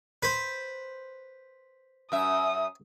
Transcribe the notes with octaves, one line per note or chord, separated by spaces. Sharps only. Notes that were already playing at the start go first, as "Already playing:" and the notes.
B4 C5
F#2 E5 D#6